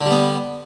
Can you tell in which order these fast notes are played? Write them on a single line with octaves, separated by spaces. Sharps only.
D3 G3 B3